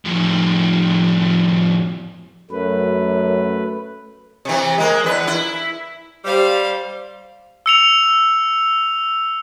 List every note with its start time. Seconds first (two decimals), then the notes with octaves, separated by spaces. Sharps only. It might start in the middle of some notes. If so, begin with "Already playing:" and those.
0.05 F2 A2
2.51 F#2 A3 B4
4.45 C3 E3
4.78 G#3 A#3
5.04 E2 B4
5.27 E4
6.25 G3 C5 F5
7.66 E6 C#7 F7